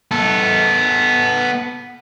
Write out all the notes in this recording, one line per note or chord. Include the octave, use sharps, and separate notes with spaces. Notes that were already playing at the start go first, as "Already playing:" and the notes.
B3 A4